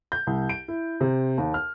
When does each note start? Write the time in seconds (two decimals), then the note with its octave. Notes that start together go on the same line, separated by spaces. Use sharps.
0.12 G6
0.27 C2
0.49 D7
0.68 E4
1.01 C3
1.38 D#2
1.54 F6